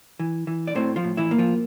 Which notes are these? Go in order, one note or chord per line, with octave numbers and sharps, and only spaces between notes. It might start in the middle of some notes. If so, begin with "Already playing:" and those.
E3
E3
D5
A2 C4 C5
F3 F4
A2
E3 E4
A#3
F3 F4